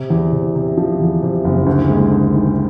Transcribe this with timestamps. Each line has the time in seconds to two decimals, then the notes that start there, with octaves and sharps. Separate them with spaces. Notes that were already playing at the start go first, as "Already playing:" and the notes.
Already playing: C3
0.10 E2
0.32 C3
0.55 C3
0.77 F3
1.00 E2
1.22 C3
1.44 F#1
1.66 D2
1.89 G#3
2.11 D2
2.34 D#3